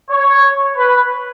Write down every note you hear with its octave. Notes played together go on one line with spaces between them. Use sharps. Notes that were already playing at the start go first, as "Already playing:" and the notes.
C#5
B4